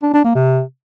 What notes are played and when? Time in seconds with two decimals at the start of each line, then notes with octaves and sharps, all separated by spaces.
0.03 D4
0.13 D4
0.24 A#3
0.35 C3